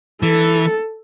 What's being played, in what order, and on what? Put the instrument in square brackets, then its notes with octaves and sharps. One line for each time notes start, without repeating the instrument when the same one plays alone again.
[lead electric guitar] E3 [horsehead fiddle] A4